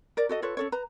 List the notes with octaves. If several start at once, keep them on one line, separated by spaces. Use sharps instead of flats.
A#4 D5
F#4 A4 D#5
F4 A4 B4 C#5
C#4 A4 C#5
B4 A#5